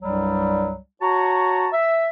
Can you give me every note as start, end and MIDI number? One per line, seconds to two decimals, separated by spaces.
0.03 0.77 36
0.03 0.77 43
0.03 0.77 54
0.03 0.77 55
1.01 1.67 66
1.01 1.67 73
1.01 1.67 81
1.01 1.67 82
1.73 2.06 76